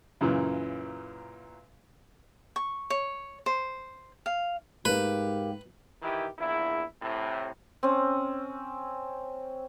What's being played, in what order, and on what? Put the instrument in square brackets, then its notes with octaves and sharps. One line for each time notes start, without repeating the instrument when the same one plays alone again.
[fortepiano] F#2 A#2 C#3 E3
[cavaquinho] C#6
C#5
C5
F5
[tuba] G#2 [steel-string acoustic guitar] A#3 G4 [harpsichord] B4
[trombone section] D#3 E3 E4 G4
A#1 E2 E4
A2 C3
[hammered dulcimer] C4 C#4